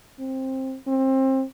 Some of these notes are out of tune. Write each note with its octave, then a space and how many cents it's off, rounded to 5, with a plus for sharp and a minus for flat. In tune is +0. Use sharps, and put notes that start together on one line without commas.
C4 +15
C4 +25